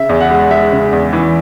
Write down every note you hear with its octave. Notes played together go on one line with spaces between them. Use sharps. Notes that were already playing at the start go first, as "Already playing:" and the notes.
Already playing: C#3 E5
E2
F#5
G#3
G#3 E5
C#3
E2
E3